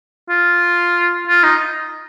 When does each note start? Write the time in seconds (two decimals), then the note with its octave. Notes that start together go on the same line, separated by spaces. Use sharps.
0.29 F4
1.27 F4
1.44 D#4